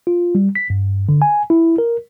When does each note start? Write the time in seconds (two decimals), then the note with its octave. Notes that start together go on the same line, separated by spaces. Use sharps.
0.07 F4
0.35 G3
0.55 B6
0.70 G2
1.09 D3
1.22 G#5
1.50 E4
1.78 A#4